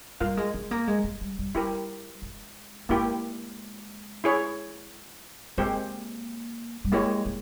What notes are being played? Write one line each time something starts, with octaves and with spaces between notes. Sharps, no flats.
G3 F4 A#4 F5
G#3
G#3
A#3
G#3
G#3
G3
G3
G3 E4 G4 A#4
G#3
G#3 A#3 E4 G4
E4 G#4 C#5
G#3 A#3 C4 G4 C5
G3
G#3 A#3 E4 G4 A#4 C#5
G#3